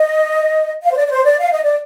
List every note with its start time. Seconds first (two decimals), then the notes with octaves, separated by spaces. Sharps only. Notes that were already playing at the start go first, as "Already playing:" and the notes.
Already playing: D#5
0.83 F5
0.92 C5
0.96 D5
1.07 D5
1.10 C5
1.25 D5
1.39 F5
1.52 D#5
1.64 D5